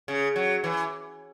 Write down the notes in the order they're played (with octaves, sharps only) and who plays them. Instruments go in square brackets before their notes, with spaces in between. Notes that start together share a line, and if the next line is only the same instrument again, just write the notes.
[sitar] C#3
F#3
E3